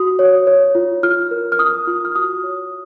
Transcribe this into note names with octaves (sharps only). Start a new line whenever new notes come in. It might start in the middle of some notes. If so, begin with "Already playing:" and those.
Already playing: F#4 D#6
C#5
C#5
F4
F4 F6
A#4
F6
F4 D#6
F4
F6
F#4 D#6
C#5